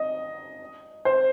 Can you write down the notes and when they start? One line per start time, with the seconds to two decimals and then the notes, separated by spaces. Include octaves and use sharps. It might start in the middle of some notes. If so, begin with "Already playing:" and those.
Already playing: D#5
1.05 C5